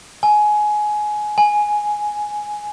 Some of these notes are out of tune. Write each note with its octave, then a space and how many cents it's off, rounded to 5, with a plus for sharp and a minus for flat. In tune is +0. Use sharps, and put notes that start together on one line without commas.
G#5 +20
G#5 +5